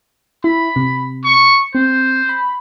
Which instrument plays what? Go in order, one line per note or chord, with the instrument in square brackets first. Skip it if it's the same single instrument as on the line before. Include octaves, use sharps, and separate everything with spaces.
[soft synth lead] E4 [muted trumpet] B5
[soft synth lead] C3
[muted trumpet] C#6
[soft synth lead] C4 [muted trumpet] C5
[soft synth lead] B5